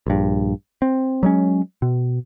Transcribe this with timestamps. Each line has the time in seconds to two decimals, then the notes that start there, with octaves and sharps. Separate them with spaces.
0.07 A#1 G2
0.82 C4
1.23 F#3 G#3 C#4
1.82 B2